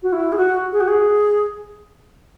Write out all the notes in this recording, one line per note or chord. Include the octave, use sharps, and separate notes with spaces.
F#4
E4
G#4
F#4
G#4
F#4
G#4